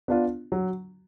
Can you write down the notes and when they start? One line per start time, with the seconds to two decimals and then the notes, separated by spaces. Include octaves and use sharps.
0.08 B3 D4 F4
0.52 F#3